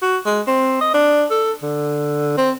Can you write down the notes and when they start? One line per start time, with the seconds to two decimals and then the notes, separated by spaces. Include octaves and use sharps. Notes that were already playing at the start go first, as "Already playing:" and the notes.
0.02 F#4
0.26 G#3
0.47 C4
0.81 D#5
0.94 D4
1.31 A4
1.62 D3
2.37 C4